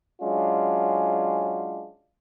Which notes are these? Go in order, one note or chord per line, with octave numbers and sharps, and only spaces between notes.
F#3 G#3 C#4 D4 F4